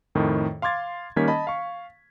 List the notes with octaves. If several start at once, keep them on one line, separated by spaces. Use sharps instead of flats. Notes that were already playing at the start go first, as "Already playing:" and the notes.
F2 A2 D#3
F5 C6 D6 G#6 A6
D#3 G3 A#3 C#4 G#6 B6
D#5 A5 B5
F5 C#6